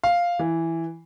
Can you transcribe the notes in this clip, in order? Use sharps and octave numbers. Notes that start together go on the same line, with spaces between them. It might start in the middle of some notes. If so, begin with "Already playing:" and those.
F5
E3